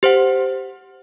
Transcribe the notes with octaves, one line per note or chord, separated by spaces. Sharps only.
G4 C5 F#5